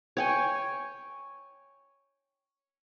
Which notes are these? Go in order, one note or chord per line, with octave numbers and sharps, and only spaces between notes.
C#5 G5 G#5